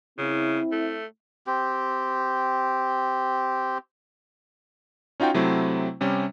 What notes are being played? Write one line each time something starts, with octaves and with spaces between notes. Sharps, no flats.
C#3 C4 E4
A3
C4 G4
C#4 D#4 F4 F#4 G5
C3 F#3 A3 C4 E4
C3 G3 C#4